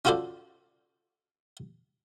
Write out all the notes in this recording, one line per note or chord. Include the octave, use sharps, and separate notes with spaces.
C#4 F4 F#4 A4 C5 D5